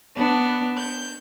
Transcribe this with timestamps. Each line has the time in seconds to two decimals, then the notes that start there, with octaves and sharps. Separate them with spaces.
0.17 B3 D4
0.79 G6